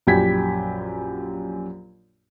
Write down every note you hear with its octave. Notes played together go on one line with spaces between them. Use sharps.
A#1 F#2 G4 B5 G#6 B6